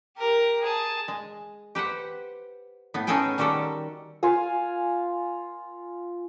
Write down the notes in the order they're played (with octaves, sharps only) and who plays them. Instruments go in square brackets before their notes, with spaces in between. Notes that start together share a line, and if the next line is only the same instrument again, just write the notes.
[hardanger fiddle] G4 A#4
G#4 A5
[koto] G#3
G4 B4 C5 F#5
A2 B3
C#4 D#4 G#4 A4 G5 G#5
D#3 G3 F#4 G4 A4
[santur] F4 F5 G#5